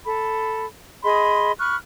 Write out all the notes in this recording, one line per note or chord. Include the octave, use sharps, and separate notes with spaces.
A4 B5
G#4 D#5 B5 C6
B5 C#6 F6 F#6